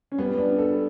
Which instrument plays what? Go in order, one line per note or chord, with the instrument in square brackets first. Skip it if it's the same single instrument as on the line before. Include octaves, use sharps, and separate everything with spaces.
[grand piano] C#4
[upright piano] G3 [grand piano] B3
[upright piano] D4
A4